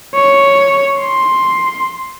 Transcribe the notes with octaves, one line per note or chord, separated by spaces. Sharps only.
C#5
C6